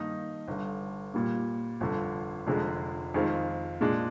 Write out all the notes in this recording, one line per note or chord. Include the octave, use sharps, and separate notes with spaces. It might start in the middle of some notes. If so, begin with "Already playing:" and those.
Already playing: G2 D#3 A#3 D#4
G1 G2 D3
A#2 G3 A#3
G1 F2 D3
F1 F2 D3 G#3
F2 D#3 G#3 C4 F4
A#2 G#3 D4